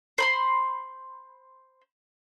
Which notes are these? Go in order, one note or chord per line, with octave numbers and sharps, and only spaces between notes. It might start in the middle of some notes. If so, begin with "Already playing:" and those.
C5 B5 C6